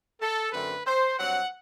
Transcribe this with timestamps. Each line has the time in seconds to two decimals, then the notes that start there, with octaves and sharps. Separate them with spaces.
0.21 A4
0.52 F#2 D3 A3 C4 B4
0.86 C5
1.17 G2 F#3 C4 F#5